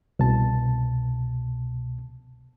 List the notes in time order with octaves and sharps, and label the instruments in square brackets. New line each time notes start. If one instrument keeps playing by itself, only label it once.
[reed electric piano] C2 B2 A5